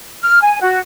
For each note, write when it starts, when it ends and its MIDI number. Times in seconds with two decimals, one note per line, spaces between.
0.22 0.39 89
0.42 0.61 80
0.61 0.78 66